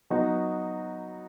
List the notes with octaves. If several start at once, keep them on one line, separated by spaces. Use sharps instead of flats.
F#3 B3 D#4 F#4